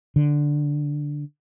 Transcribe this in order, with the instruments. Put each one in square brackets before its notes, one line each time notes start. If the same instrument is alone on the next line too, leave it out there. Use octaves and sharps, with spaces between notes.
[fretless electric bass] D3